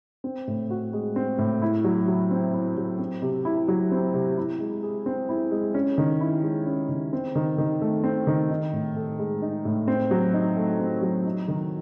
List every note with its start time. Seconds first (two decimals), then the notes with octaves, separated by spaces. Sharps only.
0.24 C4
0.47 A2
0.70 F#4
0.93 G#3
1.16 C4
1.38 A2
1.62 E4
1.84 F#3
2.08 F#3
2.31 C4
2.54 E4
2.77 F#3
2.99 C4
3.22 C3
3.45 E4
3.68 F#3
3.92 C4
4.14 C3
4.37 E4
4.60 G#3
4.83 G#4
5.06 C4
5.29 E4
5.51 G#3
5.74 C#4
5.98 D#3
6.21 E4
6.43 G#3
6.66 C#4
6.89 D#3
7.13 C4
7.35 D#3
7.58 D#3
7.81 A3
8.04 C4
8.27 D#3
8.50 D#4
8.73 A2
8.96 A4
9.19 G#3
9.42 D#4
9.65 A2
9.88 C4
10.11 F#3
10.34 D#4
10.57 A3
10.80 C4
11.02 F#3
11.26 D#4
11.48 D#3